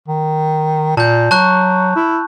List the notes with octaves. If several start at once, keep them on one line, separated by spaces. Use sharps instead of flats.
D#3
A#2 A5 G6
F#3 A5 C#6 F#6
E4